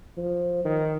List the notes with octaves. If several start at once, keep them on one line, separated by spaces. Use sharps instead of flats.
F3
D#3